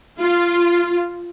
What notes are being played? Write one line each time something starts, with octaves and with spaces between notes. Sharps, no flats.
F4